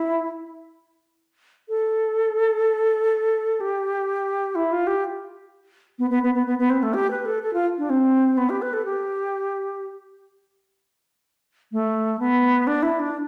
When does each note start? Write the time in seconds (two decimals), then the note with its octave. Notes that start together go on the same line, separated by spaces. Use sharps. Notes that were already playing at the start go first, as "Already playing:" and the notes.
Already playing: E4
1.69 A4
3.60 G4
4.55 E4
4.72 F4
4.87 G4
5.99 B3
6.10 B3
6.23 B3
6.35 B3
6.47 B3
6.59 B3
6.70 C4
6.83 A3
6.94 G4
7.11 B4
7.25 A4
7.43 A4
7.53 F4
7.78 D4
7.90 C4
8.37 B3
8.49 G4
8.62 B4
8.73 A4
8.85 G4
11.72 A3
12.19 B3
12.67 D4
12.82 E4
12.99 D4